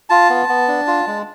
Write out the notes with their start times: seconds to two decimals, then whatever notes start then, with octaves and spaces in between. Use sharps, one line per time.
0.10 F4 A5
0.29 B3
0.49 B3
0.68 D4
0.87 F4
1.07 G#3